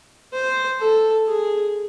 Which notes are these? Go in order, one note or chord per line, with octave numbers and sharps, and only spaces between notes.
C5
A4
G#4